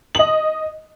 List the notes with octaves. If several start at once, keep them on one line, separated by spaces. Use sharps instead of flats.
D#5 F#7